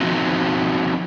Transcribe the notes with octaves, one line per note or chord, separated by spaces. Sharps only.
F3 B3 C4 D#4 F4 F#4